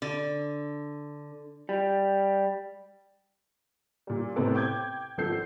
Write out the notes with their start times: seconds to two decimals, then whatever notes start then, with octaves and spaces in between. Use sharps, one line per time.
0.02 D3
1.69 G3
4.07 A#2 G3
4.35 A2 C3 B3 C4 A4
4.55 G5 D6 G6 G#6
5.18 G#1 F3 A4 G6 C7